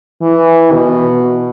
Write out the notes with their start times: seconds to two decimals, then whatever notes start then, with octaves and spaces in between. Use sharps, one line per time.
0.22 E3
0.73 B2